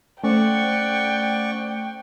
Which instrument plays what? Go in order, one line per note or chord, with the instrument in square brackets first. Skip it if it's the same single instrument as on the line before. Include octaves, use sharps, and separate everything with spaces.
[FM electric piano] A3 C5 [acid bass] C#4 [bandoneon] D5 F#5 C#6 [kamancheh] G5